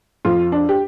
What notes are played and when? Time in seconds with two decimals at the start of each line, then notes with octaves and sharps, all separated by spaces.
0.25 F2 F4
0.52 D4
0.69 G4